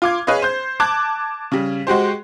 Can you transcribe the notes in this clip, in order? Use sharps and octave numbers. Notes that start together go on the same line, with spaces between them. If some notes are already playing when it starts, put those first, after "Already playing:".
F4 D6 G#6
G#4 B4 C#5 D#5 F5
C5 G6
A5 D6 F#6 G#6
C#3 G3
G#3 F#4 G4 C5